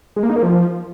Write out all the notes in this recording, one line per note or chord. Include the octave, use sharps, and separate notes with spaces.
G#3
A#3
D#4
A#3
F3